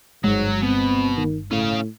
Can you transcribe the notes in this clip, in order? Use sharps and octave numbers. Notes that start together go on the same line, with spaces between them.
G1 G#2 F#3 G#3
B2 C4
D#3
A2 C#4 F5